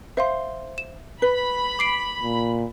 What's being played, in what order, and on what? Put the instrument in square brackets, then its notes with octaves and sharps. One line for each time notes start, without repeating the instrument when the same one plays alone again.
[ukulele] C5 [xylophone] E5 F5 C6
[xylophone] E7
[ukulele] B4 [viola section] B5
[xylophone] D6 C7 D7
[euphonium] A#2